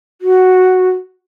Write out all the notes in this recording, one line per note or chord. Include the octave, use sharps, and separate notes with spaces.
F#4